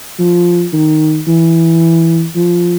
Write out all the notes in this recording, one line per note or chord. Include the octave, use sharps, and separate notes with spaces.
F3
D#3
E3
F3